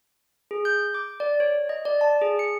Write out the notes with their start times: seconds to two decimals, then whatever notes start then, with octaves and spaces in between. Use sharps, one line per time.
0.51 G#4
0.65 G6
0.94 D6
1.20 D5
1.40 C#5
1.69 D#5
1.85 D5
2.01 A5
2.22 G#4
2.39 C#7